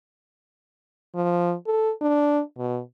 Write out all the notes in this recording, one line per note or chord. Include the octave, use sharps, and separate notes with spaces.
F3
A4
D4
B2